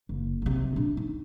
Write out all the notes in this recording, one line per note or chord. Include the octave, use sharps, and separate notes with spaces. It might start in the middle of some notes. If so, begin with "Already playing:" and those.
F#1
B1 C3
B2 D4
D#4